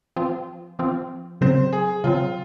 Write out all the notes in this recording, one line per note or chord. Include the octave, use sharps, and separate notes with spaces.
F3 C4 F4
F3 C4 F4
C#3 F#3 C4 C5
G#4
C#3 F#3 C4 F4